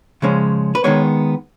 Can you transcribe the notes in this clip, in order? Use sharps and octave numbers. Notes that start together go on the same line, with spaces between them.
C#3 F3 G#3 C#4
B4
D#3 G#3 B3 C#5